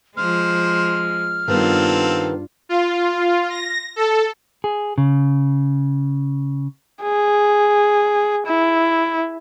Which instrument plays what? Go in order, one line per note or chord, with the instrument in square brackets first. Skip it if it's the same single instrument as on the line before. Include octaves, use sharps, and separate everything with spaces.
[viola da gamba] F3 G#3 [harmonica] C5 [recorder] F6
[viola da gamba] G2 F4 [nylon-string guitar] D#3 G3 B3 [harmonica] C4 A4 F5
[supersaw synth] F4
A#6
A4
[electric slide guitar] G#4
C#3
[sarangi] G#4
E4